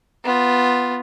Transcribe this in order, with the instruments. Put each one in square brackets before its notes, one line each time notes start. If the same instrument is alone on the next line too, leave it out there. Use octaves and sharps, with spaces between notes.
[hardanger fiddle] B3 F4